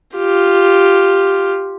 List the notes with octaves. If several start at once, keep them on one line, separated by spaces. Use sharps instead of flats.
F4 G4